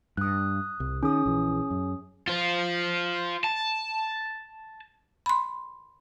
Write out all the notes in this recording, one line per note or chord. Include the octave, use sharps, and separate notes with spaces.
G2 D#6 F#6
C2
D#3 C#4 G#4 D#6
A#1 E3
F#2
F4 C5
A5
B5 C6